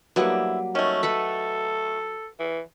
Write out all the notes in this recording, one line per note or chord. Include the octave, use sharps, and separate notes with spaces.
D3 F#3 G3 A#3 B3 E4
D#3 A3 C#4
A4 B4 F#5 B5
E3